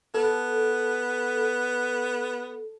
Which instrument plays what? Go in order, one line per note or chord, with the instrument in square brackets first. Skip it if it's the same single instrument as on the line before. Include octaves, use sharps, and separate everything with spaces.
[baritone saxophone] B3 [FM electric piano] A4